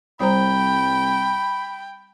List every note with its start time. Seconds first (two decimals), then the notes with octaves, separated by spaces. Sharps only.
0.20 C2 G3 C5 G5 A#5 B5